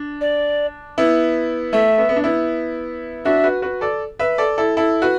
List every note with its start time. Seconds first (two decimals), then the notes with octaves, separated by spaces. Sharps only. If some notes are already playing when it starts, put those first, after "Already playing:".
Already playing: D4
0.21 D5
0.98 B3 E4
1.73 A3 E5
1.98 B3
2.09 B3
2.16 D4
2.24 B3 E4
3.25 D4 F#4 E5
3.44 F#4 B4
3.62 F#4 B4
3.81 A4 D5
4.19 B4 E5
4.38 A4 D5
4.58 E4 A4
4.77 E4 A4
5.02 F#4 B4